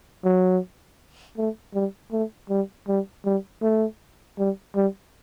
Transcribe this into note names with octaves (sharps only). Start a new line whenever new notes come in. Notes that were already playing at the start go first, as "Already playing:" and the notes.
F#3
A3
G3
A3
G3
G3
G3
A3
G3
G3